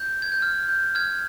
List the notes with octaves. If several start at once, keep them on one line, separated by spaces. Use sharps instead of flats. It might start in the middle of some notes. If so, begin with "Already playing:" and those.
Already playing: G6
G#6
G6
F6
G6
F6 G#6